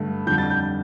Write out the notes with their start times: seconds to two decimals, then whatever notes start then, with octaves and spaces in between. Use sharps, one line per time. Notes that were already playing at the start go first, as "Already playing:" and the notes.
Already playing: G2 D3 A3
0.27 F2 D3 G3 G6
0.38 A6
0.50 G6